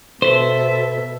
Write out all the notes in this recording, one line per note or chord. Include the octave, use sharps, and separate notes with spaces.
B2 A4 B4 C5 E5